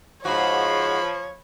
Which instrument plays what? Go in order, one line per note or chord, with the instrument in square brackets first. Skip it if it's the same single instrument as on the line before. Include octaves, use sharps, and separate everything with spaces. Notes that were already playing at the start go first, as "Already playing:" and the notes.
[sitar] G#2 F#4 [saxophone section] F3 [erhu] C#5 [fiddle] B5